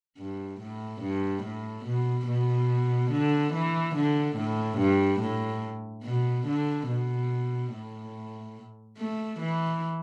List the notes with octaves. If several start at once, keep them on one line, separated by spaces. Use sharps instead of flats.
G2
A2
G2
A2
B2
B2
D3
E3
D3
A2
G2
A2
B2
D3
B2
A2
A3
E3